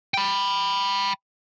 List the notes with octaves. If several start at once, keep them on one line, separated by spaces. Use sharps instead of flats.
G5 B5